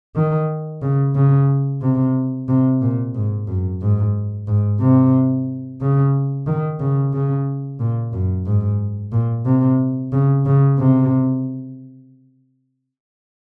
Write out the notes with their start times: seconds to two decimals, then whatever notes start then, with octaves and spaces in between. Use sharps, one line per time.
0.15 D#3
0.82 C#3
1.15 C#3
1.82 C3
2.48 C3
2.81 A#2
3.14 G#2
3.47 F#2
3.81 G#2
4.47 G#2
4.80 C3
5.80 C#3
6.46 D#3
6.80 C#3
7.13 C#3
7.79 A#2
8.13 F#2
8.46 G#2
9.12 A#2
9.45 C3
10.12 C#3
10.46 C#3
10.78 C3